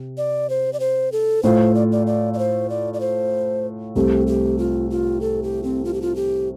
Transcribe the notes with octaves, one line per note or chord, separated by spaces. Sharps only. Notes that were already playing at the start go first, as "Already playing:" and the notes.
Already playing: C3
D5
C5
D5
C5
A4
A2 A3 F4 C5
D5
D5
D5
D5
C5
D5
D5
C5
C2 C3 A3 C4 G4
G4
F4
F4
A4
G4
C4
F4
G4
F4
G4